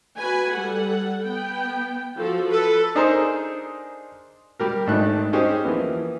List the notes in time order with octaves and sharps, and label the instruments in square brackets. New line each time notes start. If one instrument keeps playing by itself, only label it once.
[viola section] F#4 B4 G#5
G3 A4 F#5
B3 G5
F3 F#4 A4
[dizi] A4 [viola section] B4
[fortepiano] D4 D#4 G#4 A#4 C5 A#5
G3 G4 A#4
G#1 A3 D4 D#4 F#6
C#4 D#4 G4 G#4 C5
E3 F3 A#3 B3